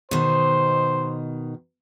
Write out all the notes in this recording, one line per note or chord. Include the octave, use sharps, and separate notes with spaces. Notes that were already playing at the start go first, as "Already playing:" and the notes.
B2 D#3 C5